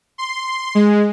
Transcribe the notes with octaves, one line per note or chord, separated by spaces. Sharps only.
C6
G#3